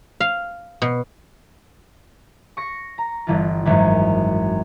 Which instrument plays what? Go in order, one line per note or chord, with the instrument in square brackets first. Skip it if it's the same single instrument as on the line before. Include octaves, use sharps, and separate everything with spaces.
[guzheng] F5
B2
[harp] C#6 A#6 C#7
A#5
G1 E3 F4
G#1 F#2 E3